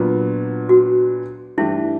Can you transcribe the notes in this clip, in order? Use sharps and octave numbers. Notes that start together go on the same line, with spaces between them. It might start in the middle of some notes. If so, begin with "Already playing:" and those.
Already playing: A#2 F#3 B3 D4 F4
F#4
G2 E3 A3 D4 E4 G4